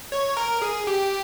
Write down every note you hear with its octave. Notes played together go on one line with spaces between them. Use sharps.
C#5
A#4
G#4
G4